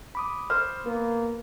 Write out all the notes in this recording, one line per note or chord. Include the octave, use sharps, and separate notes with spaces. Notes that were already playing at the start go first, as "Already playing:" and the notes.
B5 D6 D#6
C5 F6
A#3 B3